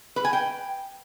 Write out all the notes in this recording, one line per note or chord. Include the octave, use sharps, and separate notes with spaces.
B4
G#5
G5